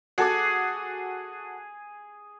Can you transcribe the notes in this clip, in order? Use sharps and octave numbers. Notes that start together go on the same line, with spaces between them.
F#4 G#4 A4 D6